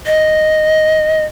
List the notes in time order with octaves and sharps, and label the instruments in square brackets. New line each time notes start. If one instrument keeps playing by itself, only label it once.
[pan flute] D#5